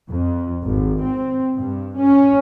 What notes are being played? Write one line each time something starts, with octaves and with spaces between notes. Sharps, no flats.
F2
G#1
C4
G2
C#4